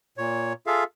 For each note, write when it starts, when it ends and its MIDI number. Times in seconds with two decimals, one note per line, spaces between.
0.18 0.53 46
0.18 0.53 73
0.67 0.84 65
0.67 0.84 68
0.67 0.84 69
0.67 0.84 76
0.67 0.84 77